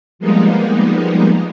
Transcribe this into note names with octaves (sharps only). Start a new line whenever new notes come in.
F3 G3 G#3 A#3 B3 D#4